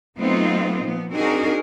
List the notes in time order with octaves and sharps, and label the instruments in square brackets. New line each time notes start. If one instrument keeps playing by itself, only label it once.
[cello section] F#3 A3 B3 C4 D#4 F4
A#2 F3 B3
C4 D4 D#4 F#4 G#4 A#4